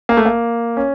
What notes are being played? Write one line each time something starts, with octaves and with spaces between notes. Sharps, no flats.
A#3
A3
A#3
C#4